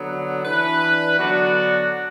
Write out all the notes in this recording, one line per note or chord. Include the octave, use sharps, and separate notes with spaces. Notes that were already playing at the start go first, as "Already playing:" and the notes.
Already playing: D3 F#3 B3
E3 D4 B4
D3 F#3 B3 D4 F#4